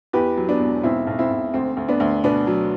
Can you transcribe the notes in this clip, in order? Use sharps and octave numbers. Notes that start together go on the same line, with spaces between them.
E2 G4 B4
F#3
B3 D4
E1
B1 C4 E4
B1
C4 E4
B1
D2 C4
D2
B3 D4
D2
B2 B3 D4
F#3